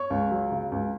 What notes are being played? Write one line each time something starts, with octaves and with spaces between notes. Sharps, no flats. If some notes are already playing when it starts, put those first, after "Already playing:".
Already playing: C#5 C#6
C#2
F#3
C#3
C#2